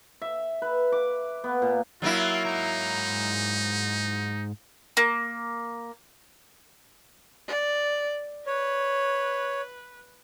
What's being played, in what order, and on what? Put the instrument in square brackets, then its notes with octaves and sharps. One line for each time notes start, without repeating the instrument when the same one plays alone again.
[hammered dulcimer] E5
B4
D6
B3
A#2
[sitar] F#3 A#3 E4 [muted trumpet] F4
[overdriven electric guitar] G#2 A#5 [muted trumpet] D#4
[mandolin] A#3
[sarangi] D5
[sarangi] B4 [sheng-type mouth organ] C#5